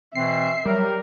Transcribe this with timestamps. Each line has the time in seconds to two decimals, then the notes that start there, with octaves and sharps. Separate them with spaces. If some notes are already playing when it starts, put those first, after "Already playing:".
0.15 B2 E3 C4 E5 C7
0.65 F#3 G3 A#4